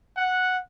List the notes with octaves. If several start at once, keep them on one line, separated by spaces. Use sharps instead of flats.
F#5